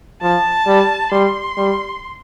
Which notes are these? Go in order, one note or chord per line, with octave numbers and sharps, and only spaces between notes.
F3 A5
G3
G3 C6
G3